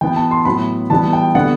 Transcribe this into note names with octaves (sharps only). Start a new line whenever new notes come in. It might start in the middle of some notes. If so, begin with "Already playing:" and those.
E3 B3 G5
A5
C6
A2 F#3 B3 B5
E3 G3 B3 A5
G5
D3 G3 B3 F#5